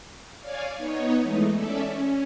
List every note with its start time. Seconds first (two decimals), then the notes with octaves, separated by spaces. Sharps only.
0.40 C#5 D5 F5 G#5
0.76 B3 D#4 C#5
1.21 E3 G#3 A3 D#4
1.53 C#4 A4 D5 E5
1.86 C#4